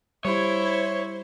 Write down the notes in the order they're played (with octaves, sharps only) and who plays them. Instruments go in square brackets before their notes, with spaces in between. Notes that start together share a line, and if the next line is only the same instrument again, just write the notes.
[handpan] G3 [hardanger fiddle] E4 [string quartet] C5 [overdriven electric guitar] C#5